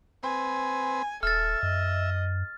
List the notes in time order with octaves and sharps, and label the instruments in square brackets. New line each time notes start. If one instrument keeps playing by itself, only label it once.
[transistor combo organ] C4 B4 [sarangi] G#5
[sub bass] D#1 [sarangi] A4 [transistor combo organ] E5 [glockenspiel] F6 A6
[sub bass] F#2 [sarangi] D#5